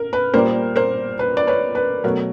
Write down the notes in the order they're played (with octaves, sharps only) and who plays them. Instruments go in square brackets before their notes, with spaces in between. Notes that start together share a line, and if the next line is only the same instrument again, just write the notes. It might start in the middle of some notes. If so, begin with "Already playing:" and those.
Already playing: [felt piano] A#4
B4
A#2 G3 A#3 A#4 C5
A#4 C5
B4
D5
B4 C#5
B4
B2 F#3 A3 A#4